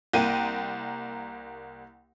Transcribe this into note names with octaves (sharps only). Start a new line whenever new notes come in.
C2 A#3 G5 D#7